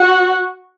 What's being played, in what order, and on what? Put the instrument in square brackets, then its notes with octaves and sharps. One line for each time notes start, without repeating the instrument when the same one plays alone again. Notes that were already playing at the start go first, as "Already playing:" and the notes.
Already playing: [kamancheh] F#4